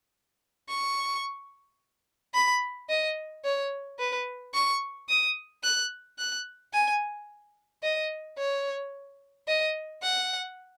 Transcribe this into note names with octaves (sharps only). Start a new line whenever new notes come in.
C#6
B5
D#5
C#5
B4
C#6
D#6
F#6
F#6
G#5
D#5
C#5
D#5
F#5